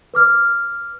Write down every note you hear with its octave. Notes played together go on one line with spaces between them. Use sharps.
B4 D6 F6